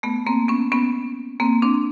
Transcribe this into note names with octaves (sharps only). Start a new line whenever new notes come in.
A3 B3
A#3 C4
B3 C#4
B3 C#4
A#3 C4
C4 D4